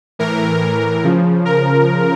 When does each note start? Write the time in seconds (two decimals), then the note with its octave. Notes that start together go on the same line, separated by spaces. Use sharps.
0.19 A2 E3 A#4
1.04 C#3 F3
1.45 A#4